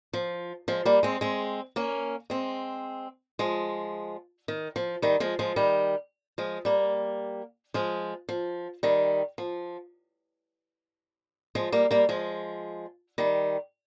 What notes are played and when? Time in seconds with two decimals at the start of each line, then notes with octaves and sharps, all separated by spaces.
0.13 F3
0.68 F3 G#3
0.85 G3 A#3
1.03 G#3 C4
1.21 G#3 C4
1.76 A#3 C#4
2.30 G#3 C4
3.39 F3 G#3
4.48 D#3
4.76 F3
5.02 D#3 G3
5.20 F3 G#3
5.39 F3 G#3
5.56 D#3 G3
6.38 F3 G#3
6.65 G3 A#3
7.74 F3 G#3
8.29 F3
8.83 D#3 G3
9.38 F3
11.55 F3 G#3
11.72 G3 A#3
11.91 G3 A#3
12.09 F3 G#3
13.18 D#3 G3